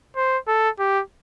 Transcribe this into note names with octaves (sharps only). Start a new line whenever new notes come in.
C5
A4
G4